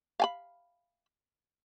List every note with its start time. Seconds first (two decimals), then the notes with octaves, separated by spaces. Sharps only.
0.20 F5 G#5 B5